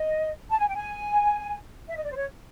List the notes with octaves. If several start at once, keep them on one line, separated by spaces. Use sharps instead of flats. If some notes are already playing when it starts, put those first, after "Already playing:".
Already playing: D#5
A5
G#5
G5
G#5
E5
D#5
D5
C5
C#5